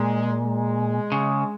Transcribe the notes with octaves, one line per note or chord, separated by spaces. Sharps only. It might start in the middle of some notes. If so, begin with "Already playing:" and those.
Already playing: A#2 G#3
G#3
C#3